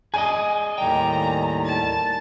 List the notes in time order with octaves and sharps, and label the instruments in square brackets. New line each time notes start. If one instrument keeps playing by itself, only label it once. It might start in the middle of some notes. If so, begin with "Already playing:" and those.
[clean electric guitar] G#4 D5 D#5 [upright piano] G#5
[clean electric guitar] D#2 G5 [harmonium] A2 D#3 G3 [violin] A#5
[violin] A5